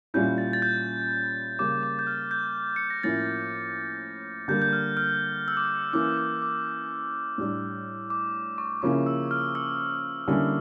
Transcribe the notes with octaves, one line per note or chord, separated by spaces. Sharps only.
A#2 G3 C#4 E4 G6
A6
A6
G6
C#3 G3 A#3 D6
D6
G6
F6
G6
C#7
A#6
A2 F3 A#3 C#4 E4 A6
D3 G3 A#3 G6
G6
F6
F6
E6
D6
E3 A#3 C#4 E4 D6
D6
D6
A2 G3 D4
D6
C#6
C#3 F3 A#3 C#4 E4 D6
E6
F6
E6
D3 G3 A#3 C#4 E4